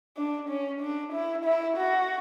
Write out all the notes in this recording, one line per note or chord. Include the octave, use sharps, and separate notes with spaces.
D4
C#4
D4
E4
E4
F#4